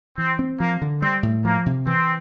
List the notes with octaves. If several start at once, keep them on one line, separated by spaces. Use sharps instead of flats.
E3 C4
C4
F3 A#3
D3
G3 C4
A2
F3 A#3
C3
E3 C4